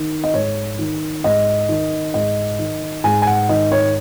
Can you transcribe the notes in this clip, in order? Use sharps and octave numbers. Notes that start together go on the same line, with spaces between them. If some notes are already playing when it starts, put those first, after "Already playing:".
Already playing: D#3
D#5
G#2 C#5
D#3
G#2 D#5
D#3
G#2 D#5
D#3
G#2 G#5
G#5
F#5
D#3 D#5
C#5